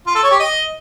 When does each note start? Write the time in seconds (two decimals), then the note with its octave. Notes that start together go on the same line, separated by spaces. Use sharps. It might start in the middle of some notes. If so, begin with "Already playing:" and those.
0.07 F4
0.15 A4
0.23 C#5
0.31 G4
0.40 D#5